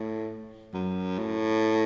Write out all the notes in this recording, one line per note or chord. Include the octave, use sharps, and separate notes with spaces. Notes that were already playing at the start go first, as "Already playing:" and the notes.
Already playing: A2
F#2
A2